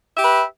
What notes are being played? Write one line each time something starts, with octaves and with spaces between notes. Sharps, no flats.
G4 B4 E5